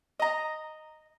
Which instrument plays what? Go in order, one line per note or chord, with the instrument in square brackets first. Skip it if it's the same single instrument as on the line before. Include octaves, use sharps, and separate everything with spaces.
[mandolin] D#5 A#5